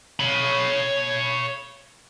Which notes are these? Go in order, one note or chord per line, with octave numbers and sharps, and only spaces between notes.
C#5 B5